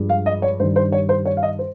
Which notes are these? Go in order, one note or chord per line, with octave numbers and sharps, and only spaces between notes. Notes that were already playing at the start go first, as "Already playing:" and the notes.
Already playing: G2 F3 G#3
F5
D#5
C#5
G2 D#3 G3 C5
C5
C#5
C5
C#5
F5
D#5
C5